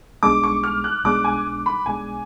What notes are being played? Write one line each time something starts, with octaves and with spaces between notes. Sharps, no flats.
B1 B2 G#3 D4 D6
C#6
F6
F#6
B1 B2 G#3 D4 D6
G#5
B5
B1 B2 G#3 D4 G#5